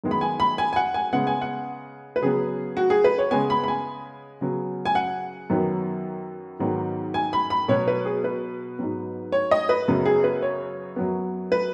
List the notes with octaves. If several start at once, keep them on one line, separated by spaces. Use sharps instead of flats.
F#2 D#3 G#3 B3
B5
G#5
B5
G#5
G#5
F#5
G#5
C#3 G#3 B3 F#5
G#5
F#5
B4
C#3 F#3 B3 G#4
F#4
G#4
B4
C#5
C#3 G#3 B3 G#5
B5
B5
G#5
C#3 F#3 B3
G#5
F#5
F#2 D#3 F#3 B3
G#2 D#3 F#3 B3
G#5
B5
B5
B2 F#3 B3 C#5
B4
G#4
B4
G#2 F#3 B3
C#5
D#5
B4
F#2 C#3 F#3 B3
G#4
B4
C#5
F#2 F#3 B3
B4